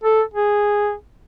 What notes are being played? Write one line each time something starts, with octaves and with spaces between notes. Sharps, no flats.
A4
G#4